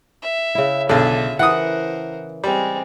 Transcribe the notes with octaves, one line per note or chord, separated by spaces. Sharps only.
E5
C#3 E4
B1 D3 F4 G#4 A4 E5
E3 A#4 C5 F#5 D#6
G3 G#3 C4